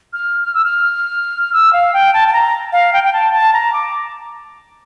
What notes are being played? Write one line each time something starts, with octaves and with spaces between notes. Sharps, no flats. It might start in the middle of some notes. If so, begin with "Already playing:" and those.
F6
F6
E6
F6
E6
F5
G5
A5
A5
A#5
F5
G5
G5
A5
A5
A#5
D6